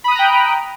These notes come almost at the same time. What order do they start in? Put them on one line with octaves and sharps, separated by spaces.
B5 D#6 F#6 A#5 G5